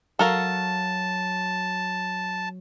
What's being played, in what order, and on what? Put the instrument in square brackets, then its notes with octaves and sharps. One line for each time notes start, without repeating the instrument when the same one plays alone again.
[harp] F#3 F#4 F#5 [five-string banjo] A4 A#4 F5 [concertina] A5